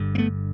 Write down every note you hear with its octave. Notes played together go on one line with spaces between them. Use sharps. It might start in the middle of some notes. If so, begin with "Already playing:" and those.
Already playing: G1 G2 D3
A#3
A3 B3